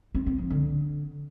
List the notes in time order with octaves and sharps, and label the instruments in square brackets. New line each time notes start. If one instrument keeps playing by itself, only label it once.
[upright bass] C4
C4
F3
D3